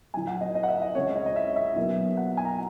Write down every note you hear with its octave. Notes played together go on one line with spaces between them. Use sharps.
A#1 A#2 F#3 G#5
F#5
D#5
D#5
F#5
E5
D#5
C#2 C#3 G#3 C#4 C#5
D#5
D#5
E5
E5
B1 B2 F#3 A#3
F#5
G#5
A#5